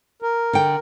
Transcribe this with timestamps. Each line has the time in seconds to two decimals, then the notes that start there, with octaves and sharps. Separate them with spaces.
0.22 A#4
0.53 D3 G5